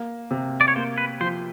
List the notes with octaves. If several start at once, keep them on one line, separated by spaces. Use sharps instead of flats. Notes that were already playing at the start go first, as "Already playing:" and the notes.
Already playing: A#3
C3
D5
C#5
A#3 C5
B4
F3 C5